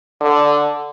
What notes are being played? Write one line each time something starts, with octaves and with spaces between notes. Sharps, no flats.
D3